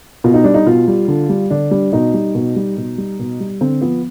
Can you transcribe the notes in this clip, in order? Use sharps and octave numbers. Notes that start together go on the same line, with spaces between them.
B2 F4
D#4
G3 D4
D#4
B2 F4
G3
D3
G3
D3 D4
G3
B2 D#4
G3
B2
G3
B2
G3
B2
G3
D3 C4
F3 B3